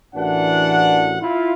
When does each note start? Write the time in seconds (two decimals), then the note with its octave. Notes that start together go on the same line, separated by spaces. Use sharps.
0.16 A1 E3 D4 F#4 A#4 F#5
1.22 E4 F4